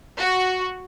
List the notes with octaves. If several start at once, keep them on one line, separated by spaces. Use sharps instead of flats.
F#4